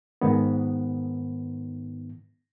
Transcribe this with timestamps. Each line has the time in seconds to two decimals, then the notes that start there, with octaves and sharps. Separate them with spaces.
0.21 G#2 D#3 B3